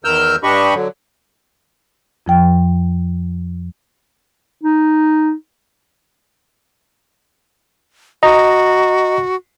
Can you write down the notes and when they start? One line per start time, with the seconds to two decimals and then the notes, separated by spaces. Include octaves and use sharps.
0.04 E2 D#3 A#4 E6 F6 G6
0.43 G2 D4 G4 D#5 B5 C#6
0.74 D3 F#3
2.26 F2 F3 G5
4.63 D#4
8.23 F#4 D#5 A#5